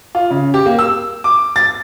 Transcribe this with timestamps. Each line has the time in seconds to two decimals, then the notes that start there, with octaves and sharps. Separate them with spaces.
0.15 F4
0.30 C#3
0.54 G4
0.66 A#3
0.79 E6
1.24 D6
1.56 A6